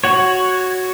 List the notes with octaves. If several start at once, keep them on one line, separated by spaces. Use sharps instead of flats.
F#4 C#5